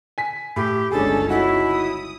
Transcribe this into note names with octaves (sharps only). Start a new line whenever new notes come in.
G#5 B6
A2 G4
G1 C#2 C#4 D4 G#4 A4
D#4 E4 F#4
D#6